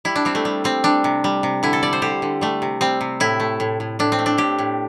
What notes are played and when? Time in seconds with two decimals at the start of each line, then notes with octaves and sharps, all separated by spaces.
0.05 G3 E4
0.16 D4
0.25 G3 C4
0.35 A3
0.45 G3
0.64 G3 C4
0.84 G3 D4
1.04 C3
1.24 G3
1.43 C3
1.63 D3 E4
1.73 A4
1.83 G3 D5
1.93 C5
2.02 D3 G4
2.22 D3
2.41 G3 A3
2.62 C3
2.81 G3 C4
3.01 C3
3.20 A2 E4
3.40 A3
3.60 A2
3.80 A2
3.99 A2 D4
4.12 C4
4.19 A3
4.26 D4
4.38 A2 G4
4.58 A2